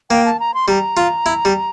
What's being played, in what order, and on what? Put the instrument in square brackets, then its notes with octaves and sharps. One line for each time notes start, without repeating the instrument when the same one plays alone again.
[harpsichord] A#3 [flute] G5
[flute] A5
A#5
C6
[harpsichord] G3 [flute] A#5
[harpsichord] F4
E4
G3